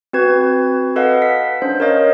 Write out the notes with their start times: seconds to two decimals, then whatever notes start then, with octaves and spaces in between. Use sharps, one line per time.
0.13 C4 F#4 B4 G#6
0.96 A4 B4 D#5 F5 F#5
1.22 B6
1.62 C#4 D4 C5
1.80 A#4 C#5 D#5 F5